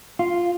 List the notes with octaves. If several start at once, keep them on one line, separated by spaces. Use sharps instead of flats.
F4